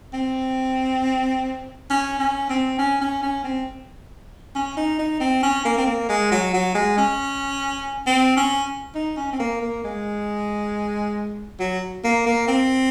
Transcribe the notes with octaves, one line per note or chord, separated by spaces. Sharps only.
C4
C#4
C#4
C4
C#4
C#4
C#4
C4
C#4
D#4
D#4
C4
C#4
A#3
C4
A#3
G#3
F#3
F#3
G#3
C#4
C4
C#4
D#4
C#4
C4
A#3
A#3
G#3
F#3
A#3
A#3
C4